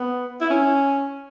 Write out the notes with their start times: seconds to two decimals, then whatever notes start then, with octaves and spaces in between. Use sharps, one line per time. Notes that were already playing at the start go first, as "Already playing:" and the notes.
Already playing: B3
0.41 E4
0.50 C#4